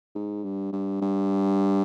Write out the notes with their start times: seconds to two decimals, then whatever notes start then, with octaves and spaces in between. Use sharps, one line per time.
0.15 G#2
0.44 G2
0.72 G2
1.01 G2